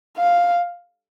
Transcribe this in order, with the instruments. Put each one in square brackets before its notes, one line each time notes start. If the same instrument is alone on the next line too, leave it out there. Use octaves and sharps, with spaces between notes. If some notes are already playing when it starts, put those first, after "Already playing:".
[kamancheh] F5